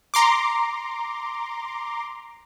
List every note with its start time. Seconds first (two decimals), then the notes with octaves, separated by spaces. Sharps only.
0.14 A#5 C6 D6